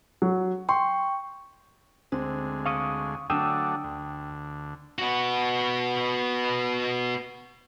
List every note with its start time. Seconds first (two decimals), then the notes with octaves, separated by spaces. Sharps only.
0.22 F#3
0.69 G5 C6 C#6
2.12 D2 G#3 C4
2.66 F5 C#6 D#6
3.30 D3 F#3 A3 D4 G5 D#6 E6
3.84 D2
4.98 B3 F#4